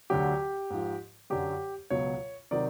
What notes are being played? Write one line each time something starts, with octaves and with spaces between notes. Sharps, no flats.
D2 D3 F#3 G4
G#2 F3
F#2 D3 F#3 G4
C#2 B2 F#3 C#5
C3 D#3 F#3 D5